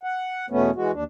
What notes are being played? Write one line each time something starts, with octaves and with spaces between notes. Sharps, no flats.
F#5
E2 B2 A3 B3 C#4
E3 G#3 F#4
D#2 D4